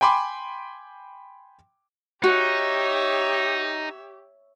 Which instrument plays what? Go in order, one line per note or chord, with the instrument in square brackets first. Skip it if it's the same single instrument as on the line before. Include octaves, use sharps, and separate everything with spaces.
[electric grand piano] G5 G#5 B5 C6 D6
[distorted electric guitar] D#4 [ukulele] F#4 [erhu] G4 [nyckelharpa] C#5 E5